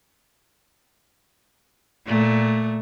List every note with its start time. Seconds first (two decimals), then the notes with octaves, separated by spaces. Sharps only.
2.06 A#2 A3